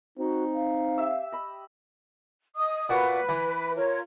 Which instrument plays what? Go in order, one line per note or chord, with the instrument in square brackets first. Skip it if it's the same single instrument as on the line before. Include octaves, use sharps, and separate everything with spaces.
[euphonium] C4 [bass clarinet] D#4 [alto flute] F#4
[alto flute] F5
[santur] G4 E5 E6
D#5 B5 E6
[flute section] D#5 D#6
[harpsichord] A#2 F#4 [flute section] B4
[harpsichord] E3
[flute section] F4 A#4 C#5